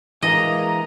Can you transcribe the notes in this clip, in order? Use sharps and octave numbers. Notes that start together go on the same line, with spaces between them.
E3 G#3 A#3 D#5 A#5